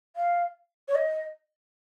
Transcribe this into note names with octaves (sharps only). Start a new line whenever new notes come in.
F5
C#5
D#5